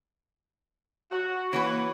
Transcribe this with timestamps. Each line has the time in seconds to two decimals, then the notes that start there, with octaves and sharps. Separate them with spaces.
1.11 F#4
1.53 E3 A#3 F#4 B4 C#5